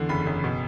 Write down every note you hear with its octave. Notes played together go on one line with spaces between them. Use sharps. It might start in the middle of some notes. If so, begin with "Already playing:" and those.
Already playing: E2 D3
F#1 B5
F#1
B2